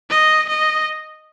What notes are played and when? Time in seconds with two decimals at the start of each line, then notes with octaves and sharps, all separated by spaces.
0.10 D#5
0.49 D#5